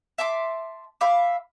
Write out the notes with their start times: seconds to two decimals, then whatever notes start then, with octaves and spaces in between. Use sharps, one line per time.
0.18 E5 A5 C6 D6
1.01 E5 F5 B5 D6